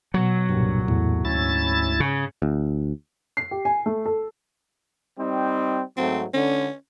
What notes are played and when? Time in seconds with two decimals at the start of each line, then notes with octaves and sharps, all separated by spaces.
0.14 B2 F#3
0.49 C2 G2 A#2
0.88 E2 A2
1.25 D2 G#2 C#4 E4 A6
2.00 C#3
2.42 D2
3.37 C7
3.51 G4
3.65 G#5
3.86 A3
4.06 A4
5.18 G3 C4 D#4
5.97 G#2 F#3 A3 C4
6.34 D3 C#4